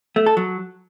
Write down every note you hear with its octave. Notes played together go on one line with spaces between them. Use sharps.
A3
A4
F#3